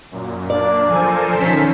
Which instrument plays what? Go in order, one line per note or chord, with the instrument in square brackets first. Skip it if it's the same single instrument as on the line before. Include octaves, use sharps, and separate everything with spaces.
[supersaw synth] F#2 A#2
[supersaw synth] A#3 D4 [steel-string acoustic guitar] D5
[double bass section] F3 [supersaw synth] A4 A#4 C5 [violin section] G#5
[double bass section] D#3 F3 [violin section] C#4 B6